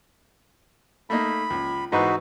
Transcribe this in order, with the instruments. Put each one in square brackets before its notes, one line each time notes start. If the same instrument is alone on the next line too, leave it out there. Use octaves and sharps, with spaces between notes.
[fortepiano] A3 A#3 D#4 [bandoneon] B5
[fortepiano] C#2
[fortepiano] G#2 E3 B4 [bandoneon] D#4 F#4